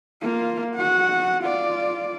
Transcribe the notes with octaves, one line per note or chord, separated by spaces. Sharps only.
A#3 F4
F#4 F#5
F4 D5